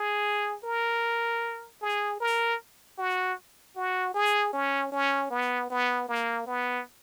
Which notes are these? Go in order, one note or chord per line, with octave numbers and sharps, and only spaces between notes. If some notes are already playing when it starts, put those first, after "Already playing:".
Already playing: G#4
A#4
G#4
A#4
F#4
F#4
G#4
C#4
C#4
B3
B3
A#3
B3